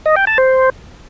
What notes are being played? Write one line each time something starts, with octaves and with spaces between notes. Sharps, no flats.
D#5
G5
A5
C5